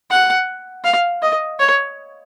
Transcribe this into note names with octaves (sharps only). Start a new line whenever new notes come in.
F#5
F5
D#5
C#5